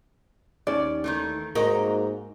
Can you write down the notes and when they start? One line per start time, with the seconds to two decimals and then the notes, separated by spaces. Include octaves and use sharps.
0.67 D#2 C#4 D5
1.04 D#3 E3 A3
1.55 G#2 A#3 D#4 F#4 D#5 A#5